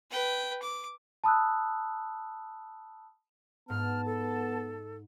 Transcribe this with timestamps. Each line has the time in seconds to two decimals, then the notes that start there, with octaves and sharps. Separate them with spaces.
0.10 B4 G5
0.62 D6
1.24 A5 B5 D#6 E6 F#6
3.70 G#2 B3 A5 F6
4.06 A4